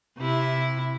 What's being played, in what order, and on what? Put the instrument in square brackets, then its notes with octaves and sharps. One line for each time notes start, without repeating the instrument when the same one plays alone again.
[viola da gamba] C3 E4